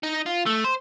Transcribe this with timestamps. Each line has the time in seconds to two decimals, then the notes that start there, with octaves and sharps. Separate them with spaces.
0.03 D#4
0.26 F4
0.46 A3
0.64 C5